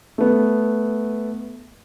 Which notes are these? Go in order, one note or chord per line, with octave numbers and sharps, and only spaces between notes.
A3 B3